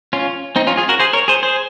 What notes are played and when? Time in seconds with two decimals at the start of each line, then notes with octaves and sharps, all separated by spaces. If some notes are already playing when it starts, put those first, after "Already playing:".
0.13 C#4 F4
0.56 C4 D#4
0.67 C#4 F4
0.77 F4 G#4
0.89 F#4 A#4
1.00 G#4 C5
1.13 A#4 C#5
1.28 G#4 C5
1.43 G#4 C5